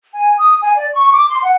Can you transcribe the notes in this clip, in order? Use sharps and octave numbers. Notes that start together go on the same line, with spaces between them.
G#5
D#6
G#5
D5
C#6
D6
C6
F#5